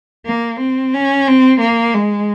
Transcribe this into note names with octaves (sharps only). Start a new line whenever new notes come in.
A#3
C4
C#4
C4
A#3
G#3